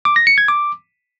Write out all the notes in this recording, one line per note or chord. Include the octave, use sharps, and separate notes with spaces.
D6
A#6
C#7
G#6
D6